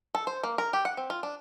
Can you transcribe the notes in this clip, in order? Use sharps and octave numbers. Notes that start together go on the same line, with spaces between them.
A4
C5
A#3
A#4
G4
F#5
C4
F4
D4